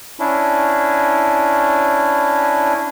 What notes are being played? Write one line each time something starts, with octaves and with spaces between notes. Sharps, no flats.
C#4 D4 E4